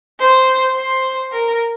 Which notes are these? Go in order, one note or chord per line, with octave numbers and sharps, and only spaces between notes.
C5
C5
A#4